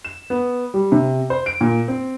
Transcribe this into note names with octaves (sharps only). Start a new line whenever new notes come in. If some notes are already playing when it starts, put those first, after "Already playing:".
E7
B3
G3
C3
C5
D7
A#2
C4